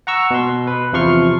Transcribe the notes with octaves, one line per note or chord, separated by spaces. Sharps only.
F#5 A#5 C#6 E6
B2 C6
B4
E2 C3 F3 C6 C#6 F6